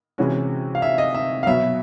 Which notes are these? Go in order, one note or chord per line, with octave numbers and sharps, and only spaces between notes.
C3 E3 G#3 C#4 F#4
F5
E5
D#5
E5
F5
B2 F#3 B3 E5